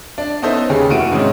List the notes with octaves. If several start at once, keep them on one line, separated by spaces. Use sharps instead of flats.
D4
B3 C#4 D#4 A4 C5 E5
D#2 C#3 G4 G#4
F1 E3 A3 F#4 D7 D#7
G#2 C3 D#3 C4 C#4 D#4